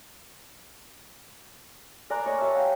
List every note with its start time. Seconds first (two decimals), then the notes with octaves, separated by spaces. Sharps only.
2.10 A#4 D5 G#5 A#5 C6 F#6
2.26 C#5 D#5 D6
2.39 G4 E5 A5 C#6 F6
2.55 F5 G5